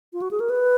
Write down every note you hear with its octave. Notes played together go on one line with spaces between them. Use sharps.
F4
F#4
G#4
A#4
B4